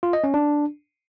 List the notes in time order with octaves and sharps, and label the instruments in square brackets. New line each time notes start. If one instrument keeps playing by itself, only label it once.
[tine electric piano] F4
D#5
C#4
D4